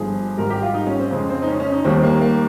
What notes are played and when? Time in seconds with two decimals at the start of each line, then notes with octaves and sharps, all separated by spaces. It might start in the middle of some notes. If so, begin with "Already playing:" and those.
Already playing: G1 G2 F3 G#3 G#4
0.37 G#1 G#2 G3 A#4
0.50 G4
0.62 F4
0.74 D#4
0.87 C#4
0.99 C4
1.11 F2 C#3 G#3
1.30 C4
1.42 D#4
1.48 C#4
1.60 C#4
1.72 D#4
1.85 D#2 D#3 G3 C4
2.03 A#3
2.21 A#3